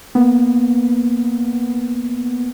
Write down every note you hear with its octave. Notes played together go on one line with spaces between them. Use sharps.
A#3 B3